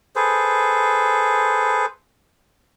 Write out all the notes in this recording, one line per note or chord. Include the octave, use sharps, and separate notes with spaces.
G#4 A4 B4 C5